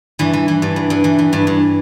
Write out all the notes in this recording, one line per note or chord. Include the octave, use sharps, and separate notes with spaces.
G2 E3
E3
E3
G2
G2
G2
E3
E3
G2
G2